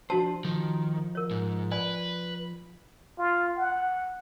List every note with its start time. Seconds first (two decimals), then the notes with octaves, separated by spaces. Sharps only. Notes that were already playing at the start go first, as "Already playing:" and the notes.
0.10 F3 D4 F#4 C5 A5
0.45 D#3 F3
1.15 A#4 C#5
1.31 G#2
1.72 B4 D5 G#5
3.19 F4
3.57 F#5